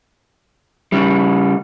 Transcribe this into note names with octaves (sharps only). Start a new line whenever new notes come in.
C#3 G3